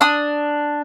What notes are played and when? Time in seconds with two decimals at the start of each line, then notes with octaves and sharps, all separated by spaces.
0.01 D4 D#6